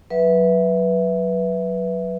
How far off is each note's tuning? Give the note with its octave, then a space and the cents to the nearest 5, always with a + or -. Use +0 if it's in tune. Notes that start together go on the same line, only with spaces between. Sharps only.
F#3 +0 B4 -5 E5 +0